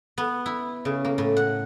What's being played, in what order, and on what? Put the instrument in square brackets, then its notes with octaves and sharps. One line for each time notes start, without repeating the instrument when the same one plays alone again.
[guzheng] B3
E4
C#3
A#3
A2
F#5